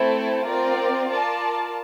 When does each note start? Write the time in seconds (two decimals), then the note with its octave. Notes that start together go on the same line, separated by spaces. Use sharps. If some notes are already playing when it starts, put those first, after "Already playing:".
Already playing: A3 C4 E4 A4 C5
0.45 C4 F4 A#4 D5
1.09 F4 A#4 D5 A5